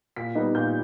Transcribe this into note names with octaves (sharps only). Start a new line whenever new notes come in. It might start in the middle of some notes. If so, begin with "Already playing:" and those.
A#2 B6
G3 B3 D#4
A#2 G6